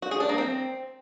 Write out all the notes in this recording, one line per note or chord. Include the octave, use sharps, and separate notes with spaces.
F#4
G#4
D4
A#3
C4